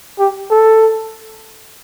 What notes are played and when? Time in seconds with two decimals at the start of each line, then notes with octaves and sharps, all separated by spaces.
0.19 G4
0.51 A4